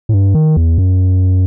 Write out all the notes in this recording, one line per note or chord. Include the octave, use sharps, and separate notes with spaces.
A2
G2
D#3
E2
F#2